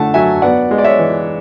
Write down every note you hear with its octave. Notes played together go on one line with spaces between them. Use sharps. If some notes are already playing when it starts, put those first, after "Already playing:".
Already playing: D3 A3 F#5 A5
F#3 E5 G#5
B3 D5 F#5
G#3
D5
C#5 E5
E3